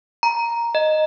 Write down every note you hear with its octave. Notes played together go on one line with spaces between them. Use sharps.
A#5
D#5